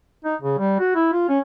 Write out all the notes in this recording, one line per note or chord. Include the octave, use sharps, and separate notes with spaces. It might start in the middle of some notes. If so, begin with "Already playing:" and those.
D#4
C#3
G3
F#4
E4
F4
C#4